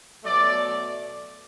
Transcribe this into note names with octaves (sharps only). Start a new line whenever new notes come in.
B2 F#3 A3 D5